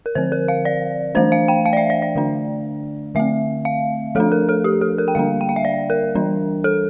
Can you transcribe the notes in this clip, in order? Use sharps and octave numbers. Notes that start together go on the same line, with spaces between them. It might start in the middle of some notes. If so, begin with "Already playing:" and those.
A#4
D3 F3 C4 C5
A#4
F5
D5
E3 A3 D4 C5
F5
G5
F5
D5
E5
D5
D5
D3 A3 D4
D3 A3 C4 E5
F5
F3 A3 D4 A4
A#4
A4
G4
A4
A#4
G5
D3 G3 A#3 D4 F5
G5
F5
E5
D5
A#4
E3 G3 D4
A4